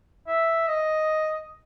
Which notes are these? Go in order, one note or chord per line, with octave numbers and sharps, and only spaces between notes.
E5
D#5